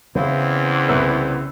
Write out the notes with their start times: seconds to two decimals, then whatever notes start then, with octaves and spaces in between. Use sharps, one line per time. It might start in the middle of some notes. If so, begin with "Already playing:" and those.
0.15 E2 C#3 C4 E4
0.89 C2 B3 E6